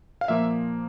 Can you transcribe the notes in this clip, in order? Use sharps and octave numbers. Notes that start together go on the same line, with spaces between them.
F5
A#2 F3 A#3 E5